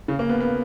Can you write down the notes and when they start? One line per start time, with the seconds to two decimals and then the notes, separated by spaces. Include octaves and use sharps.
0.08 C#3
0.19 A#3
0.29 B3
0.40 B3